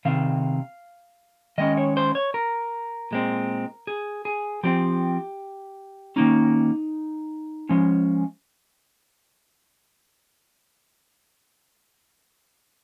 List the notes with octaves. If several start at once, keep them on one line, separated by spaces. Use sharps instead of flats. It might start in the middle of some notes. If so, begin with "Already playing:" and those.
C3 D#3 F5
D#3 G#3 C#4 D#5
C#5
C5
C#5
A#4
A#2 G#3 C4
G#4
G#4
F3 C4 G4
D#3 A#3 C#4 D#4
F3 G#3 C#4